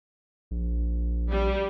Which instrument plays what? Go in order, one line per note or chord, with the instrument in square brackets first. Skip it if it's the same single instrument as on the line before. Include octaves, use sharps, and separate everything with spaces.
[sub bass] A#1
[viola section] G3